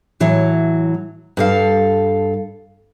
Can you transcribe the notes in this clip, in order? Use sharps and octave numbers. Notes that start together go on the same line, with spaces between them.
A2 E3 F#3
G2 A4 F5